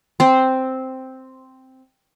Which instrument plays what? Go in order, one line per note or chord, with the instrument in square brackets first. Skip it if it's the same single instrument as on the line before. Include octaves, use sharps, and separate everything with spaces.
[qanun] C4 C5